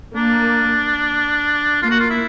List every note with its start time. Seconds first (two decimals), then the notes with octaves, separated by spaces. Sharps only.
0.16 A#3 D4
1.82 A#3 F4
1.91 F#4
2.00 F4
2.10 E4